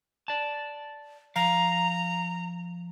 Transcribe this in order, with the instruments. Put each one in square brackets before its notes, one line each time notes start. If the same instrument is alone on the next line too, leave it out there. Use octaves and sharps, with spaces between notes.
[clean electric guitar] D5 A5
[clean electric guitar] F3 F5 [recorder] A#5